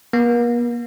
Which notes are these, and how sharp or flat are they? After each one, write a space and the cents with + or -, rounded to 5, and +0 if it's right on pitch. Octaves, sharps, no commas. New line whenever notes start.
A#3 +40